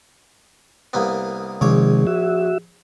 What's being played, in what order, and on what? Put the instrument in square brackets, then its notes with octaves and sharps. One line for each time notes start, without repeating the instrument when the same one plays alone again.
[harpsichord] C2 A#3 B3
[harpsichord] A#1 C#5 D6 [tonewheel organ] C3 D#3 G#3
[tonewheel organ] F#4 E5